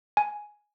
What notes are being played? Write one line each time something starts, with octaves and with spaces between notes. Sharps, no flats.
G#5